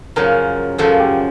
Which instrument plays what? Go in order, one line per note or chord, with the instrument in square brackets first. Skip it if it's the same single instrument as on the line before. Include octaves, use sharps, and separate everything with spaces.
[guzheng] F#2 C#3 F3 [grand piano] A#4
[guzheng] F#2 C#3 F3 [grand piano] A4
[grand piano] G4